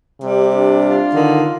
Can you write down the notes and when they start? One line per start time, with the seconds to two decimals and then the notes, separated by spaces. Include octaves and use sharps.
0.21 C3 G3
0.52 D4
0.83 F4
1.13 D3 D#3